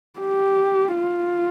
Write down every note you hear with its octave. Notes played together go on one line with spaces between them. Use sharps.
G4
F4